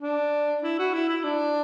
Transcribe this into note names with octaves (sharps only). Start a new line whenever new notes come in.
D4
E4
F#4
E4
E4
D4